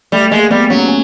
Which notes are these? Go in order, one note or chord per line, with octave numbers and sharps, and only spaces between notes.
G3 A3
G#3 A#3
G3 B3
F#3 C#4
C#4